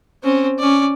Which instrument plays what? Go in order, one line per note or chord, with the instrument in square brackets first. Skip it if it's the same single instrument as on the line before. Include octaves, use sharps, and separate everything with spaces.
[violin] C4 C#4
C#4 D5